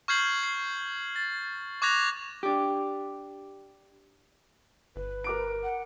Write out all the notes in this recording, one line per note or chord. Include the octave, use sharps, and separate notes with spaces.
C#6 F6 G6 G#6 C7 F#7
C7
A6
C#6 D6 F#6 G#6 A#6 F7
D4 G4
G1 B4
A#4 D6 D7
F#5